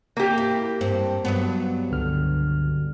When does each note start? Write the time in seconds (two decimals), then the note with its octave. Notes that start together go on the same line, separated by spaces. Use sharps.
0.17 A#3 G4
0.38 E4
0.81 G2 C4
1.25 G2 F#3 B3
1.91 C#2 D3 F6